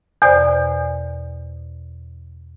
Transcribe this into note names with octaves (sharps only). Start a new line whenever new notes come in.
E2 B2 C5 D5